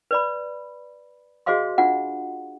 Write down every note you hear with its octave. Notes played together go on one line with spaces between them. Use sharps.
B4 D5 B5
F#4 G#4 C5 D#5 F5 C6
D4 F4 F#5